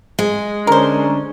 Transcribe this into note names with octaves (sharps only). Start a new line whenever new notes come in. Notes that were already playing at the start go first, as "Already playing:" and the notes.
G#3
D3 C#4 D4 A#4 C5